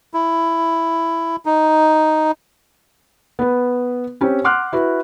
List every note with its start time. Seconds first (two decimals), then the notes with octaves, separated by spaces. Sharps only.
0.14 E4
1.46 D#4
3.39 B3 B4
4.21 C4 C#4 G4
4.44 F#5 C6 D6 F6 F#6
4.73 E4 F#4 B4